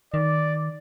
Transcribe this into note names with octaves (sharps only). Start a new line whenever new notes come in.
D#3 D5